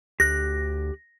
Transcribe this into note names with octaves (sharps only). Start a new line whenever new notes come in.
D2 G4 F#6 A#6